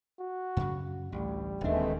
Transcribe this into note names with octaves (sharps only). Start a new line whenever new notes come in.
F#4
F#2 C#3
A1 D2 G3
D#1 D#2 D#3 E3 G#3 A3 C4 D4